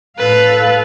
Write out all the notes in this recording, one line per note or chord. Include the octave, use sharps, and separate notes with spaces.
A2 A4 B4 F5